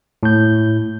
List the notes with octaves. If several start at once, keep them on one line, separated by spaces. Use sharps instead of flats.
A2 G6